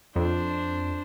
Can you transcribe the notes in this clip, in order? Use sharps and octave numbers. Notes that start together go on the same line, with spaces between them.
F2 D4 C5